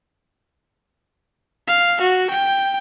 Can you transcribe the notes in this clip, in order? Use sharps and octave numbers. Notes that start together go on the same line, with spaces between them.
F5
F#4
G5